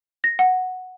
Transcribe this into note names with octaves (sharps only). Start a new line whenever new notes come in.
A#6
F#5